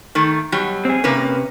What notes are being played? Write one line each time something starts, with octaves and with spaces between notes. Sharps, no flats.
D#3 A3
B2 F#3 G3
C4 G#4
C3 A#3 C#4 B4